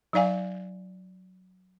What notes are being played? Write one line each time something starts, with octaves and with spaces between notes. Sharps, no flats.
F#3 D#4 D5 F5 G#5